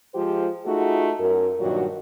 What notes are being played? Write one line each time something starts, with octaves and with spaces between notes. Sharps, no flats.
F3 G#3 F4 G4 C5
A3 D#4 F4 F#4 G#4
F#2 A#4
G2 A#2 D#3 F#3 F#4